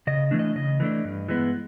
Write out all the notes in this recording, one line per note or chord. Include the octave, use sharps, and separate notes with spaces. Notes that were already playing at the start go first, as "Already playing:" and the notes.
C#3 D#5
E3 A3 D4
D#5
C#3 D#5
E3 A3 D4
G2
E3 G#3 B3